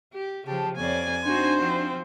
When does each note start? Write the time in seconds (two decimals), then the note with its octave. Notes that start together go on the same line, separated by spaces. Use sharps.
0.13 G4
0.47 C#3 F3 G4 A5
0.77 F2 C#5 D5 G#5
1.25 C4 D4 D#4 F#4 C5
1.62 F3 C4